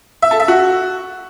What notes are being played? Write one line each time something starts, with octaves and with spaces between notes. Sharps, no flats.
E5
A4
E5
F#4